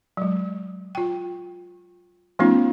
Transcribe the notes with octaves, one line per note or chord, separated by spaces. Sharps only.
F#3 G#3
F4 G5
F3 A3 B3 C#4 D#4 F4